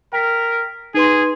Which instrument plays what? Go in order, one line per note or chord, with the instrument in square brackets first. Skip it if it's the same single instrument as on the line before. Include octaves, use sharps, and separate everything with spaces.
[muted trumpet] A#4 [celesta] G5 B6
[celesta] D#4 B4 C6 [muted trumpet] G#4